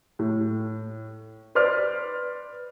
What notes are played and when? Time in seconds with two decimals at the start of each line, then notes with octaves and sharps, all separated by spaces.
0.19 A2
1.55 B4 C5 D5 F6